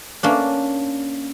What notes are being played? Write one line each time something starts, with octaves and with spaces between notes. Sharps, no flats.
A#3 C#4 D4